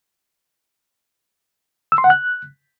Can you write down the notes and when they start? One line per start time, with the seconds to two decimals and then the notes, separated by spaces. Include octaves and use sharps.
1.92 E6
1.98 C6
2.04 F#5
2.10 F#6